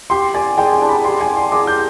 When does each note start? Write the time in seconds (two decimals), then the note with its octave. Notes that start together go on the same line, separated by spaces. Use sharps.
0.10 G4 C6
0.34 D5 G#5
0.57 G#3 G5
0.73 G#5
0.82 D4
0.89 B5
1.05 G4 C6
1.21 G#5
1.29 D5
1.36 C6
1.52 G#3 D6
1.67 G6